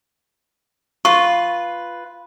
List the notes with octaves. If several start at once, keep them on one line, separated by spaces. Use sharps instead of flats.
F4 B4 C#6